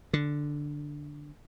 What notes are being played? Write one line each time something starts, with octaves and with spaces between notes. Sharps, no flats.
D3